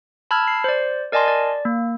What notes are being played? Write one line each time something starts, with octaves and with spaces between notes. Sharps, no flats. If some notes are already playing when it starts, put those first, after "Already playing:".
A5 B5 E6 F6 G#6
C7
C5 D5
A#4 D5 D#5 G#5 A5 C6
D5
A#3